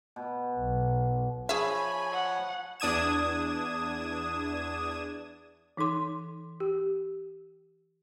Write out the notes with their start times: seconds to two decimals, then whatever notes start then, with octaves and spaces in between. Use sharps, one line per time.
0.16 B2
0.58 B1
1.49 F3 G#4 C#5 E5 G#5 B5
2.12 F#5
2.80 E2 D4 D#6 G#6 E7
5.77 E3 D#4 A4 C6 D6
6.60 G4